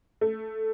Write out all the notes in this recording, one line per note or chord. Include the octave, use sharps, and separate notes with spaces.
A3